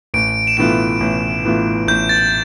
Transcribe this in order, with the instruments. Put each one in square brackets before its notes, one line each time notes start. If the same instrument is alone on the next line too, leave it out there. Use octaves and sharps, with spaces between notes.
[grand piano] A1 [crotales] D7
[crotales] E7
[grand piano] A2 E3 B3 F4 [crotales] D7
[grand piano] A1
A2 E3 B3 F4
[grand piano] A1 [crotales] G6
[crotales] A6